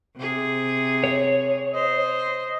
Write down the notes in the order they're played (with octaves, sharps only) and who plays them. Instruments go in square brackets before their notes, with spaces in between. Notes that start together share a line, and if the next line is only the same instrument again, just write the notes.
[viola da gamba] C3 G#4
[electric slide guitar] C#5
[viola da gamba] C5 [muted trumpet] D#5